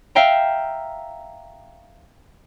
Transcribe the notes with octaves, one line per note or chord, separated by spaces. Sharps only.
E5 F5 G5 A#5